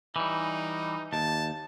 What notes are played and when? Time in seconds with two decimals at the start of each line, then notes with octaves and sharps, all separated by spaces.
0.16 E3 G3 D#4
1.13 D#2 A5